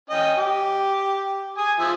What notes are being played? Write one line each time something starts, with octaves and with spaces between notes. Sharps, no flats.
C#4 D#5 G5
G4
G#5 D#6
F3 E5